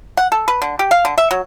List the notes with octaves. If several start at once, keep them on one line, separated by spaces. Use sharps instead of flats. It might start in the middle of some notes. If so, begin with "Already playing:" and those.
F#5
A4
B4
D3
G4
F5
D3
E5
F#3